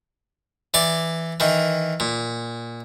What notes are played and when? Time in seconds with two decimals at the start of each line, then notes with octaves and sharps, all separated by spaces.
0.74 E3 D5 D6
1.40 D#3 E3
2.00 A#2